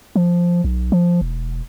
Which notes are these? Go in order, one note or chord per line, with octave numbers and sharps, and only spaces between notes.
F3
B1
F3
E1